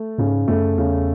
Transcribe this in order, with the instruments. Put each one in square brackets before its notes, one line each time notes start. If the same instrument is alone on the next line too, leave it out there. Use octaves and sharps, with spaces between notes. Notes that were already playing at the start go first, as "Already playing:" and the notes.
Already playing: [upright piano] A3
[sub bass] G#2 [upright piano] C#3
[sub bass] F#2 [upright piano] A3
[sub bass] E2 [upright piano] C#3